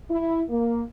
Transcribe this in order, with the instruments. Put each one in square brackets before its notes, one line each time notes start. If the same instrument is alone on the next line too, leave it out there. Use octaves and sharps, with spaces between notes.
[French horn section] E4
A#3